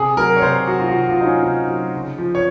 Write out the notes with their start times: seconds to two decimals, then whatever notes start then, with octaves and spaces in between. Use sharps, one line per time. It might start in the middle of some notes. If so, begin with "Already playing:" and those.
Already playing: C3 G#4
0.17 F#3 A#4
0.37 C#5
0.42 C3 C5
0.67 F#3 F#4
0.79 F4
0.88 F#4
0.92 C3 F4
1.09 F4
1.17 F#3 D#4
1.26 C#4
1.43 C3 D#4
1.68 F#3
1.94 C#3
2.18 F3
2.35 C#5